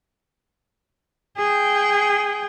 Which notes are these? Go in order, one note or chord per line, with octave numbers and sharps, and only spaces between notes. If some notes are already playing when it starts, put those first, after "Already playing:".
G#4 G5